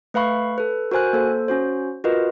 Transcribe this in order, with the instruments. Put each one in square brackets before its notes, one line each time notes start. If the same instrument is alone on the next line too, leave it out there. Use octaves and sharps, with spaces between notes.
[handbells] A3 B4 F5 B5 C#6
A4 B4
F#4 A#4 C5 G#5 F#6
A#3 A4 C5
C#4 F#4 C5
F4 F#4 A#4 B4 D#5